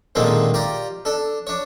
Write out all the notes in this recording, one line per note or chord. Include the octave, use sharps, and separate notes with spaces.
A#2 D3 D#3 G#3 A3 C4
F4 G4 D5 A#5
D4 A4
D4 C#5